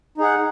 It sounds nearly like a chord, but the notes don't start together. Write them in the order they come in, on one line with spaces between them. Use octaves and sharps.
D#4 G#4 F#5